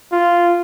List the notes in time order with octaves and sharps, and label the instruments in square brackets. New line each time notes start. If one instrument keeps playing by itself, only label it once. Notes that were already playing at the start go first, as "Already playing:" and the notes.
[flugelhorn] F4